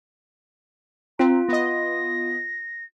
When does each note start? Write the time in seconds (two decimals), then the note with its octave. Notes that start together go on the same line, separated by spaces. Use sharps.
1.19 C4 F4 A#5
1.49 B3 D#5 A#6